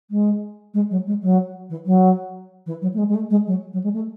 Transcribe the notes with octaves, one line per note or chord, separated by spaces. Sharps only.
G#3
G#3
F#3
G#3
F#3
E3
F#3
E3
F#3
A3
G#3
G#3
A3
G#3
F#3
F#3
G#3
A3